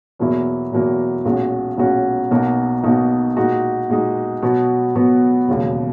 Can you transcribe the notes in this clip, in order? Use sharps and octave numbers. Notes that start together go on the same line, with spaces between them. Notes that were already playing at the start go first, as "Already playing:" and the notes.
E2 B2 F#3 A#3 E4
E2 B2 F#3 A#3 E4
B1 A#2 G#3 C#4 F#4
B1 A#2 G#3 C#4 F#4
B1 B2 A#3 D#4 F#4
B1 B2 A#3 D#4 F#4
A#2 G#3 D#4 F#4
A#2 G#3 D#4 F#4
B2 F#3 B3 F#4
B2 F#3 B3 F#4
E1 D#2 C#3 F#3